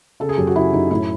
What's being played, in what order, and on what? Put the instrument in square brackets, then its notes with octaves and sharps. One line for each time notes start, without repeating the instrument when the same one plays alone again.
[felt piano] C#3 A4
G#4
F#2 G4
F#4
C#3 E4
F#2 D#4
A2 E4